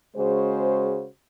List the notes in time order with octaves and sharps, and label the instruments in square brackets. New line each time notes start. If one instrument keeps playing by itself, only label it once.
[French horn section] C#3 G#3 F#4 C5